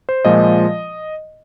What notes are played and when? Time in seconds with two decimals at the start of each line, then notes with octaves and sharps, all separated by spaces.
0.09 C5
0.25 A#2 F3 G#3 D#5